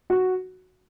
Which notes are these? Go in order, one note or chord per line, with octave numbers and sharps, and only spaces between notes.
F#4